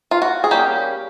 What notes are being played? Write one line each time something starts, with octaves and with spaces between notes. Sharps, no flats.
F4
F#4
G#4
G3 A#3 C#4 G4